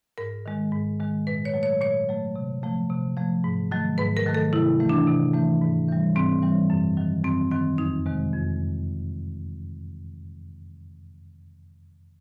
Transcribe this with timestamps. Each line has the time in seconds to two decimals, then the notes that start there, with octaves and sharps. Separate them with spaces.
0.18 G#2 A#4
0.46 D#3 G#3
0.72 G#2
1.00 D#3 G#3
1.27 A#2 B4
1.45 C#5
1.54 F#3 A3
1.63 C#5
1.81 A#2 C#5
2.09 F#3 A3
2.36 C3
2.63 F3 A3
2.90 C3
3.17 F3 A3
3.44 G#2
3.71 D#3 F#3 A3
3.98 G#2 B4
4.17 A#4
4.26 D#3 F#3 A3
4.35 A4
4.53 C3 E4
4.80 E3 A3
4.89 D4
5.07 C3
5.34 E3 A3
5.62 G#2
5.88 E3 G3
6.15 G#2 C4
6.43 E3 G3
6.70 F#2
6.97 D#3 F#3
7.24 F#2 C4
7.51 D#3 F#3 C4
7.78 F2 D#4
8.06 C3 D#3 G#3
8.33 F2